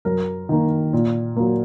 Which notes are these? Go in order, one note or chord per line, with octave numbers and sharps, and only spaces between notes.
F#2 A#4
D#3 A#3
A#2
F#3 A#3